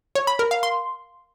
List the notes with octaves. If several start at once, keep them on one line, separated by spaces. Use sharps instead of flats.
C#5
B5
A#4
F5
C6